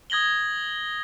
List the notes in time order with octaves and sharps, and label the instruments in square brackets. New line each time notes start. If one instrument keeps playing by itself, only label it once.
[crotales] D#6 G#6 A#6 F#7 G7